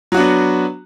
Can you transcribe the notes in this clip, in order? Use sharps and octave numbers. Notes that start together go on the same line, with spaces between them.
F#3 B3 D4 F#4